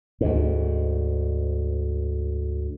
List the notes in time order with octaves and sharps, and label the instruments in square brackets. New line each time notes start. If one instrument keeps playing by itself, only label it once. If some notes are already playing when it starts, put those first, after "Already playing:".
[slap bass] D2 G#2